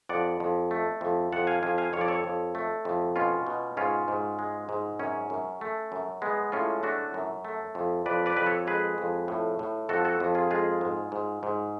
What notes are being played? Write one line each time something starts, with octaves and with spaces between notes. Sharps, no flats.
F2 D5 F#5
F2
A3
F2
F2 F#5 A5
F5 G#5
F2 F5 G#5
F5 G#5
F2 C#5
D5
A4 C#5
F2
A3
F2
B2 C#4 F4
B2
G#2 C#4 F4
G#2
G#3
G#2
F#2 C#4
F#2
A3
F#2
G#3 B3
A2 C#4 F4
A3 D4 F#4
F#2
A3
F2
F2 B4 D5
B4 D5
F2 B4
A4 C#5
G#3 G#4 B4
F2
A2
A2
F2 F#4 A4
F#4 A4
F2
F4 G#4
G#3 F4 G#4
G#2
G#2
G#2